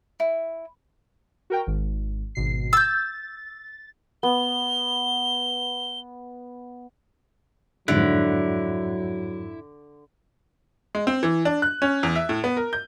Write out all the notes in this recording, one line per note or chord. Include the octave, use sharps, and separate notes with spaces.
E4
F#4 A#4 G5
G#1
G#1 B2 C7
E6 G6 A6
B3 G7
F2 G#2 D3 F#3 E4 F#6
G#3
C4
E3
D4
F#6
C#4
E2
E5
A2
B3
A#4
G6